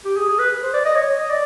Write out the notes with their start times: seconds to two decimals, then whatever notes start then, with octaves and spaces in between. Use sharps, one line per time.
0.05 G4
0.17 G#4
0.28 G#4
0.39 B4
0.63 C5
0.74 D5
0.85 D#5
0.96 C#5
1.18 D#5
1.30 D5